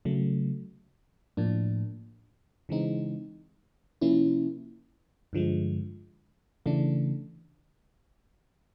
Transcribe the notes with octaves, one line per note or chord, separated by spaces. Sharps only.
C#3 F#3 A3
A2 F3 A#3 D4
C#3 E3 G#3 C4 D#4
C3 F3 A#3 C#4 E4
G2 D3 F3 G#3
C#3 E3 A3 D4